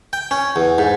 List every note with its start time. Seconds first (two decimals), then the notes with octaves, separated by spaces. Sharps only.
0.13 G5
0.31 C#4
0.56 E2
0.78 G#2